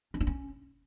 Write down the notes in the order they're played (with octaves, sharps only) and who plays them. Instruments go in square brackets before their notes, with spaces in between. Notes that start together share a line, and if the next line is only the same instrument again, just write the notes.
[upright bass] C#4
D4
C#4